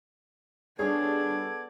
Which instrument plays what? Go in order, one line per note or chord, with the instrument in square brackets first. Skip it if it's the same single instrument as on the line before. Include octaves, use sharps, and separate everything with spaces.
[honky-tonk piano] G3 G#4 C#5 [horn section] B3 A4 D5 [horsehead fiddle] D4 [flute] G#6